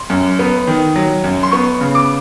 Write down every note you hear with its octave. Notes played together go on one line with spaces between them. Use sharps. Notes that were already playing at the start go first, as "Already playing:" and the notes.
Already playing: C6
F#2
B3
D#3
F#3
F#2
C6
B3 C#6
C#3
D6